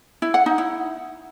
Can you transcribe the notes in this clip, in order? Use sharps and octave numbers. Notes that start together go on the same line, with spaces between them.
E4
F#5
D#4
E4